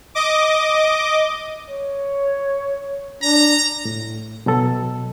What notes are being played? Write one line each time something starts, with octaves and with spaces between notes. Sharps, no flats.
D#5 D6
C#5
D4 A#5
A2
B2 F#3 A4